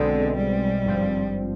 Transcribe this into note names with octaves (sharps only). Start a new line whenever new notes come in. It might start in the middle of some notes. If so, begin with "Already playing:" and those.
Already playing: B1 B2 D3 G#3 C4
G3
G#1 G2 F3 C4